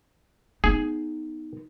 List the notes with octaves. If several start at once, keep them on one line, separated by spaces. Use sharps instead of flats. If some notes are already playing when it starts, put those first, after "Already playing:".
B3 D#4 G#4